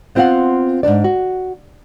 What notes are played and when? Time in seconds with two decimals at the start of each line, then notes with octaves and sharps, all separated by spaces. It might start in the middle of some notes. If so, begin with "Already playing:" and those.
0.15 B3 C4 F4 D#5 F5 F#5
0.83 G#2 B2 D4 D5
1.04 F#4